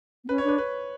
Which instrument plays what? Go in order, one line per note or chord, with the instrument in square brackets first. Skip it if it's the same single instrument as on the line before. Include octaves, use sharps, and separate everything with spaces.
[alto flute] B3
[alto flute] C#4 [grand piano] B4
[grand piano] C#5
[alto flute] D4 [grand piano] B4
[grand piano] B4